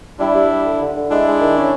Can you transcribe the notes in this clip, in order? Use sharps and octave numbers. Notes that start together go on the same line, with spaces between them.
G3 D4 E4
G3
G3
D3
D3
D3
G#3 D4 E4
G#3
D#3
C#4